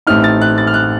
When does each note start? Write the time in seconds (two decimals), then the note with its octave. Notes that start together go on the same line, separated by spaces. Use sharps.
0.07 A1 A2 A3 C4 D#4 F6
0.24 A6
0.41 F#6
0.58 A6
0.67 F6
0.74 F#6